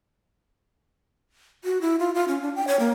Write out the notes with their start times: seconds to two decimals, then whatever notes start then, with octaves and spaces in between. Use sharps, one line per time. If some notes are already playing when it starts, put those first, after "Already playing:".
1.64 F#4
1.81 E4
1.99 F4
2.15 F4
2.28 C#4
2.42 D4
2.55 G5
2.67 C#5
2.79 A#3